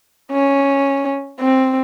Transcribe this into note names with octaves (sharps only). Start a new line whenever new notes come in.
C#4
C4